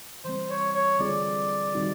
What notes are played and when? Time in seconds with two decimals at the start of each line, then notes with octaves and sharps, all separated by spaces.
0.24 E3 G3 C4 C5
0.50 C#5
0.74 C#5
0.99 D3 G3 C4 F4 G#4 D5
1.74 D#3 G3 C4 D#4 F#4